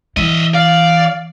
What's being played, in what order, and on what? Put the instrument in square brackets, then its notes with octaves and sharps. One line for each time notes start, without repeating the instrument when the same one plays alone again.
[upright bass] E3 [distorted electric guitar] D#5 E5
[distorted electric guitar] D5 [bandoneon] F5